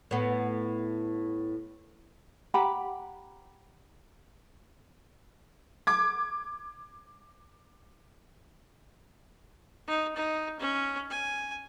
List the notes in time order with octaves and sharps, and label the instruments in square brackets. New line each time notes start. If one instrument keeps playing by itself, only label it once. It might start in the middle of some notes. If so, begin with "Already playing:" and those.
[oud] A2 B3
[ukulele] G4 F#5 A#5 B5
[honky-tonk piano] D6 G#6
[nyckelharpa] D#4
D#4
C#4
G#5